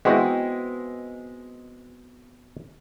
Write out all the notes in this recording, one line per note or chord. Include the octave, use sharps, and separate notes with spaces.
G#3 B3 C4 E4 F#4 D#5